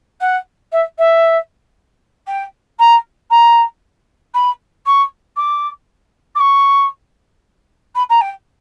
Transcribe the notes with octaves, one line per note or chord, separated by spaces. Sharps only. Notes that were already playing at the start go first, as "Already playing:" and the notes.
F#5
E5
E5
G5
A#5
A#5
B5
C#6
D6
D6
C#6
B5
A#5
G5